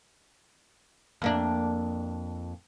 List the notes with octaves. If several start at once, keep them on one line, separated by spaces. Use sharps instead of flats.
F2 A#3 D4